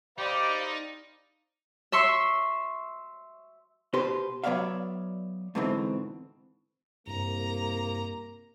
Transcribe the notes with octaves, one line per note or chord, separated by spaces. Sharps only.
D#4 G4 C5 D5 D#5 F5 B5
E5 C6 C#6 E6
B2 G4 B4 C5 C6
F#3 B3 C#5 D5 E5 F5
G#2 B2 D3 E3 C4
C2 G2 A#3 A#5